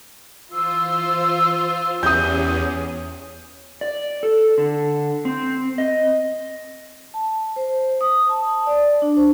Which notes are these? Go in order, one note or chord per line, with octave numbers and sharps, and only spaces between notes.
E3 F4 C5 E6
E2 C#4 G4 G#4 C#5 D#6 G6
D5
A4
D3
C4
D#5
A5
C5
D#6
A5
D5
D4
C5